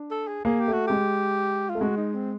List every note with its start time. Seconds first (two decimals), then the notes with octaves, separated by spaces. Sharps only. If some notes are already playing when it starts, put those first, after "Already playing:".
Already playing: D4
0.11 A4
0.28 G#4
0.45 A#3 G#4
0.60 G4
0.68 A3 F#4
0.87 G#3 G4
1.69 F4
1.75 A3
1.81 G#3 F#4
1.97 D#4
2.14 C4